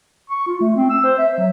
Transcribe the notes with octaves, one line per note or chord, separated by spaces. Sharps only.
C#6
F4
A3
C4
E6
C5
E5
F#3